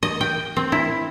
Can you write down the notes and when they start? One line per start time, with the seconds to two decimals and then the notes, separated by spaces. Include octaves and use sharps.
0.03 D#5
0.21 G5
0.57 C4
0.72 E4